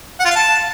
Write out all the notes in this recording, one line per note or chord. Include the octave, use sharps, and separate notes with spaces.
F#5
F4
F5
A5